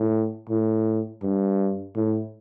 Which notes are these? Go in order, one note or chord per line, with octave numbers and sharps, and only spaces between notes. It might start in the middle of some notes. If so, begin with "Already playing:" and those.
Already playing: A2
A2
G2
A2